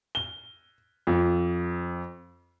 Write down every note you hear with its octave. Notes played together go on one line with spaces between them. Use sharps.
G7
F2